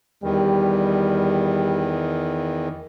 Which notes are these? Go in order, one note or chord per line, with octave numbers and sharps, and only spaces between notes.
E2 D#3 G3